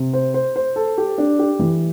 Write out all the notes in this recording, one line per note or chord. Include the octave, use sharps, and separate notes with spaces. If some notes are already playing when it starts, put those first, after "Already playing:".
Already playing: C3
C5
C5
C5
A4
G4
D4
G4
E3